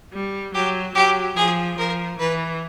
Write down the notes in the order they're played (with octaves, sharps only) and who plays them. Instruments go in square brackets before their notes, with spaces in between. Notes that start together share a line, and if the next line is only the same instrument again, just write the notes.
[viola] G3
[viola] F#3 [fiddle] G4
[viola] F#3 [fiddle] G4
[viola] F3 [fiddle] G#4
[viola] F3 [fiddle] A#4
[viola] E3 [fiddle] B4